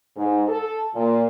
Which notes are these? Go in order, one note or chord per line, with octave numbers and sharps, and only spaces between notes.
G#2
A4
A#2